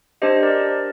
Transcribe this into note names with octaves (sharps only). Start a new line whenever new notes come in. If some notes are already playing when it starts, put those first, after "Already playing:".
D4 G4 C5 D#5
A#4 D5